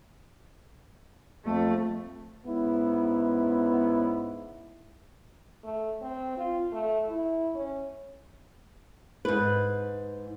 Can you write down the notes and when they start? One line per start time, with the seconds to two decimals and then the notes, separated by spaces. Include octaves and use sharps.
1.46 F2 A3
2.45 G#2 B3 C#4 E4
5.64 A3
6.02 C4
6.37 F4
6.72 A3
7.08 E4
7.55 C#4
9.25 G#2 B4